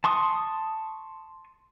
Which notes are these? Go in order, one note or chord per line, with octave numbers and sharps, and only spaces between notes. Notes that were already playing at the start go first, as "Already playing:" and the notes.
A5 C6 C#6 D#6